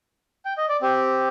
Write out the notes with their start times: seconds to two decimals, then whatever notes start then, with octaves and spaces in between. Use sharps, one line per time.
0.45 G5
0.58 D#5
0.69 D5
0.81 C4 G4